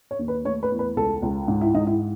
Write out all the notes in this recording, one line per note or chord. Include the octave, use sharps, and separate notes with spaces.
C#5
D#2
B4
A3 C#5
B4
E2
B4
C#2 A4
C#2
G#2
E4
G#2 D#4
E4